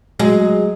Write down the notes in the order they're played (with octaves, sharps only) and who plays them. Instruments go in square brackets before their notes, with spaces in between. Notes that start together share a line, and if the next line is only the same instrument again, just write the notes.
[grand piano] F#3 [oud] G#3